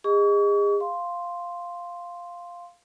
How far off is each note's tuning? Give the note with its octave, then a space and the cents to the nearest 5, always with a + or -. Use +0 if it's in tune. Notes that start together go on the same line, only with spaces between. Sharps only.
G#4 -35 D#5 +0 C#6 +35
F5 +0 C6 +0